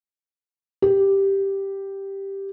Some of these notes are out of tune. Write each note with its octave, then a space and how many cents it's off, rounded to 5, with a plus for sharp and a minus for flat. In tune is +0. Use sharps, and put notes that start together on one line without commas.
G4 +0